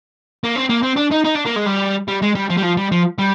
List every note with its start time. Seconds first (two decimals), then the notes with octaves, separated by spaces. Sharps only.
0.44 A#3
0.56 C4
0.69 A#3
0.82 C4
0.96 D4
1.11 D#4
1.24 D#4
1.35 D4
1.45 A#3
1.56 G#3
1.66 G3
2.08 G3
2.22 G#3
2.35 G3
2.50 F3
2.58 G3
2.63 F3
2.77 G3
2.92 F3
3.19 G3